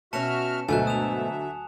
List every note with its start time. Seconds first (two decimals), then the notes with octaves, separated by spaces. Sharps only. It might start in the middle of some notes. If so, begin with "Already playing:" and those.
0.13 B2 C#4 F#4 E5 A5 F6 C#7 E7
0.69 D2 G#2 B2 F#3 A3 E5 G#5 F#6
0.87 D#6 F7